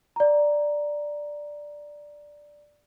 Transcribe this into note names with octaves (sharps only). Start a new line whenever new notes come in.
D5 A#5